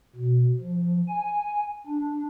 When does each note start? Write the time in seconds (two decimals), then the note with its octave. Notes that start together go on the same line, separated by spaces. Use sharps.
0.16 B2
0.60 F3
1.08 G#5
1.87 D4